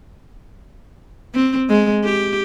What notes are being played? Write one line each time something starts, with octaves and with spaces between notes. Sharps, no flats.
C4
G#3
G4